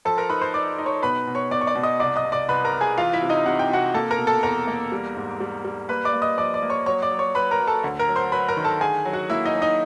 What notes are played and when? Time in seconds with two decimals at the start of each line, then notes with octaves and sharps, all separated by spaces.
0.05 F3 A4 A5
0.18 A#4 A#5
0.30 D#4 B4 B5
0.41 C5 C6
0.54 D#4 D5 D6
0.78 D#4
0.86 C#5 C#6
1.02 B2 B4 B5
1.27 B2
1.35 C#5 C#6
1.51 B2 D5 D6
1.61 C#6
1.67 D5 D6
1.76 B2
1.83 D#5 D#6
2.00 C2 D5 D6
2.16 D#5 D#6
2.24 C2
2.32 D5 D6
2.49 C2 B4 B5
2.65 A#4 A#5
2.73 C2
2.81 G#4 G#5
2.98 E3 F4 F5
3.13 E4 E5
3.22 C3
3.29 D#4 D#5
3.46 C3 F#5
3.59 G5
3.70 C3 F#4 F#5
3.94 A#3 A4 A5
4.11 A#4 A#5
4.18 B2
4.27 A4 A5
4.43 E2 A#4 A#5
4.67 A#3
4.92 G3
5.16 G#2
5.40 G3
5.65 G3
5.89 A#3 B4 B5
6.05 D5 D6
6.13 A#3
6.22 D#5 D#6
6.38 F3 D5 D6
6.54 D5 D6
6.63 A#3
6.70 C#5 C#6
6.86 F#3 C#5 C#6
7.02 D5 D6
7.11 F#3
7.19 C#5 C#6
7.35 F#3 B4 B5
7.51 A#4 A#5
7.59 F#3
7.67 A4 A5
7.84 D2
7.99 A#4 A#5
8.08 F#3
8.16 C5 C6
8.32 F#3 B4 B5
8.48 A#4 A#5
8.57 D#3
8.65 A4 A5
8.81 D3 G#4 G#5
9.05 F#3
9.13 F#4 F#5
9.30 A#3 E4 E5
9.45 D#4 D#5
9.54 F#3
9.62 D#4 D#5